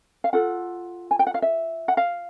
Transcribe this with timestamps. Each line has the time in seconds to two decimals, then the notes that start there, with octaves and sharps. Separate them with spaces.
0.24 F5
0.33 F4 A4 F#5
1.11 G#5
1.19 G5
1.27 F#5
1.34 F5
1.42 E5
1.88 F#5
1.97 F5